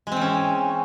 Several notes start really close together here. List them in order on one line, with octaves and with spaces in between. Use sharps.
G#3 C4 E3 C#4